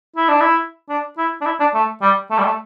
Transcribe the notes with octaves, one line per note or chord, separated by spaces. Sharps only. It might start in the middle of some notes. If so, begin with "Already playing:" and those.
E4
D4
E4
D4
E4
D4
E4
D4
A3
G3
A3
G3
A3